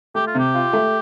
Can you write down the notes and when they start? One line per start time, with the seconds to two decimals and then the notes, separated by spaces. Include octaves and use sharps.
0.15 A3 G4
0.27 F4
0.35 C3 G4
0.54 F4
0.73 A3